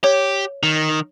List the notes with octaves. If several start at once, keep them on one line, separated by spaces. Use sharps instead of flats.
G4 C#5
D#3